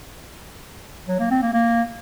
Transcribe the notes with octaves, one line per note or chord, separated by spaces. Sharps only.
F#3
A#3
C4
A#3
A#3